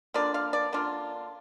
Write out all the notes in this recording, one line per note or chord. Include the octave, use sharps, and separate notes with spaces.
D3 A#3 D4 F4 D5
F5
D5
D3 A#3 D4 F4